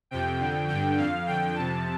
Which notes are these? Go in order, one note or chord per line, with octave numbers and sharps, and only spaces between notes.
F2 C3 G5
F2 D3
G2 D3 G5
F2 D3 F5
F2 D3 G5
F2 C3 A5